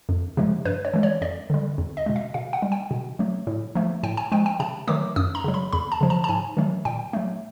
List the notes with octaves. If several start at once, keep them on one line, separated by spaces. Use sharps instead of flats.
F2
C3 F3 G#3
G2 B4
C#5
E3 G#3
C#5
F2 D5
D3 G3
E2
D#5
B2 G#3
E5
B2 F5
F#5
G3
G5
B2
F#3 A3
A2
F3 A3
A2 G5
G#5
F3 G#3 G5
G5
C3 A5
D#3 F#3 A3 D6
F#2 D#6
A#5
C#3 F#3
B5
E2 B5
A5
C#3 F3
A5
A5
G#2 G#5
D#3 F#3 A3
A#2 G5
F#3 A3